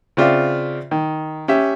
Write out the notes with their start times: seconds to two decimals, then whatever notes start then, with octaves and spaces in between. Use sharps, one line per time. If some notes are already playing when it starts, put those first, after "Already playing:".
0.17 C#3 C4 F4 D5 E5
0.91 D#3
1.48 C#4 G4 E5